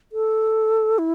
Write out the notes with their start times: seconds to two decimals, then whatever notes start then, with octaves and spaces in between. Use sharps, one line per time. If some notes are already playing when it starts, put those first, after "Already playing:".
0.12 A4
0.98 E4